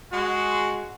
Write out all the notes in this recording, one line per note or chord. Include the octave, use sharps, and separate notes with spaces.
G#3 F#4